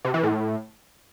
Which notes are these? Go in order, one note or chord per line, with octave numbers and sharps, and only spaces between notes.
C3
E3
A2